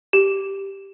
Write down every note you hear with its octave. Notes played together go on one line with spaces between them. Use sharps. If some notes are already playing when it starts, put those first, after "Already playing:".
G4